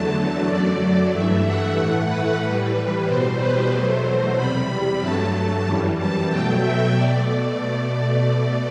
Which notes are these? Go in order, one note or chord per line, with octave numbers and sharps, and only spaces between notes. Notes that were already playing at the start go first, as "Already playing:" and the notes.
Already playing: E2 D3 F#3 A3 A5
A5
F#2 F#3 A3 D5
D5
G2 E3 A3 E5
F#5
A2 E3 A3
B4
A2 E3 G3 B4
E2 B2 G3 C5
B4
E2 B2 F#3 A3 C5
E2 C3 G3 B5
G2 F#3 A3 A5
F#2 E3 G3
A5
B2 F#3 A3 G5
E5
B2 A3 D5